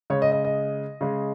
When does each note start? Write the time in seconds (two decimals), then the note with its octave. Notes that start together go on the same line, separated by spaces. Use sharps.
0.10 C#3 G#3 C#5
0.22 D#5
0.32 D#5
0.44 D#5
1.01 C#3 G#3